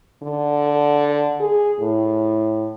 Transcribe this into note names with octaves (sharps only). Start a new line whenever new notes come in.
D3
G#4
A2